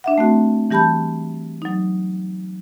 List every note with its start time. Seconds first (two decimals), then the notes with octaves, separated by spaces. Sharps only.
0.04 D4 E5 F#5
0.18 A3 C4 F#4
0.71 E3 G3 G4 A5 B5 G6
1.62 F#3 D#4